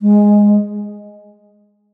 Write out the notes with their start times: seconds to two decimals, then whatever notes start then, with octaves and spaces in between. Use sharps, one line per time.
0.02 G#3